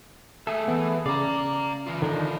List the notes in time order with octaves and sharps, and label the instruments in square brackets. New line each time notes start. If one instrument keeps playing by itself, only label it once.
[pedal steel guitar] A3 G#4 A4 [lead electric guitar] A#3 E5
[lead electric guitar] E3 [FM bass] B3
[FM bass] C#3 [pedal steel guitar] D5 [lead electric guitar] F5 A#5
[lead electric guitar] E3 F4
[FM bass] D3 [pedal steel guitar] D#3 D4 D#4